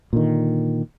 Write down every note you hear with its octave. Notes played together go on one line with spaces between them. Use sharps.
A#2 D3 D#3